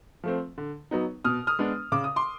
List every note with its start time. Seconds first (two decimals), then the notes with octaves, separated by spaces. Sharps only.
0.24 F3 A3 C4
0.58 D3
0.91 F#3 B3 D#4
1.24 B2 D#6 F6
1.47 D#6 F6
1.59 G#3 B3 D4
1.92 C#3 D6
2.04 D#6
2.16 C6 D6